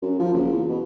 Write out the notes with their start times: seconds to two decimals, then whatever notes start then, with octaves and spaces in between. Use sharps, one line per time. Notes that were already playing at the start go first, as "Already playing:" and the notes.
0.02 F#2
0.19 F3
0.34 F#1
0.52 E2
0.69 B2